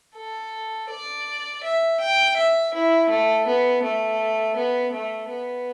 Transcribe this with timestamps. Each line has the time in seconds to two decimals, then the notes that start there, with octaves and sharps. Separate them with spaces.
0.16 A4
0.90 D5
1.64 E5
2.01 G5
2.37 E5
2.74 E4
3.10 A3
3.47 B3
3.83 A3
4.57 B3
4.93 A3
5.30 B3